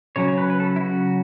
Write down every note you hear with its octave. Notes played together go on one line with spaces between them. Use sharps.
C#3 F#3 C#4 C#5
C#5
B4
B4
A4
E4
F#4